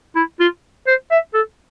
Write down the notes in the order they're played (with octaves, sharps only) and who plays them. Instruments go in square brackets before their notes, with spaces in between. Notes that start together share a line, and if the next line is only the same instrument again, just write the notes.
[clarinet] E4
F4
C5
E5
A4